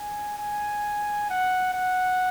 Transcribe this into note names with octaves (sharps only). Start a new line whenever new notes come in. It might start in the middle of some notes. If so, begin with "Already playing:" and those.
Already playing: G#5
G#5
F#5
F#5